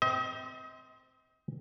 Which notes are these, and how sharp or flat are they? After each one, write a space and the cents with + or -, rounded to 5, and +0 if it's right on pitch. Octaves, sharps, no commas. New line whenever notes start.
C4 -10 D#5 +40